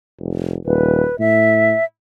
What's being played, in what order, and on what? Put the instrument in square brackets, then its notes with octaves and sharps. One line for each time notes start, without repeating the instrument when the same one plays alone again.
[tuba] F1
[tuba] D#1 [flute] B4
[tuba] A2 [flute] E5